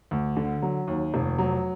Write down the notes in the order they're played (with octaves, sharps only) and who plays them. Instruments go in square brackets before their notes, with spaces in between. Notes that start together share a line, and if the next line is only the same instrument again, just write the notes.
[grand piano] D2
D3
F#3
D#2
F1
F#3